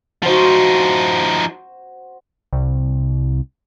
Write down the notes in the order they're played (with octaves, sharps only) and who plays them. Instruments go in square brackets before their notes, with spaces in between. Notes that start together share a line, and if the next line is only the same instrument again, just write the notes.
[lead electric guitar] F3 D#4 [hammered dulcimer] F#4 C5
[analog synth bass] C2